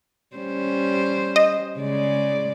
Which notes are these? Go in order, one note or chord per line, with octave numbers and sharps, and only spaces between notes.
G3 C#4 C5
D#5
C#3 G#3 D5